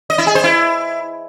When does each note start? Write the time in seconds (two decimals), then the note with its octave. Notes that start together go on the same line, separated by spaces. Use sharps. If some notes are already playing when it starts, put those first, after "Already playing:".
0.10 D#5
0.18 E4
0.27 G#4
0.35 C5
0.44 E4